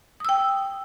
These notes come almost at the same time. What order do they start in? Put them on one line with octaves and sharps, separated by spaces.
D#6 E6 G5